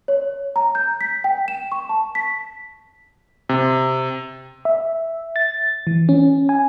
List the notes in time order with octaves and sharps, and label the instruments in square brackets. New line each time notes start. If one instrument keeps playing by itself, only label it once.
[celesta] C#5
A#5
G6
B6
G5
E7
C#6
A5
B6
[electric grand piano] C3
[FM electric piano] E5
A6
E3
C#4
G#5